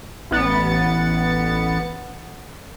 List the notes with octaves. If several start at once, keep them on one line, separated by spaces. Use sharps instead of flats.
A1 B3 A6 C#7